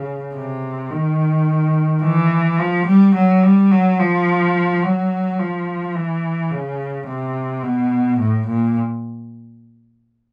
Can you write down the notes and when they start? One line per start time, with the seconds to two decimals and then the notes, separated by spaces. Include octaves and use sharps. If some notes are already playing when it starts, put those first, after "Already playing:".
Already playing: C#3
0.35 C3
0.91 D#3
2.03 E3
2.59 F3
2.87 G3
3.16 F#3
3.43 G3
3.71 F#3
3.99 F3
4.83 F#3
5.39 F3
5.95 E3
6.51 C#3
7.08 C3
7.63 B2
8.20 A2
8.47 A#2